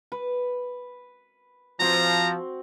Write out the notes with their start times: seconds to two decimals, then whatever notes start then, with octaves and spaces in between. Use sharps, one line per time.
0.12 B4
1.80 F3 C4 F#4 A#5